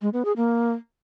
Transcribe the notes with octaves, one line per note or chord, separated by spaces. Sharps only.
G#3
B3
G#4
A#3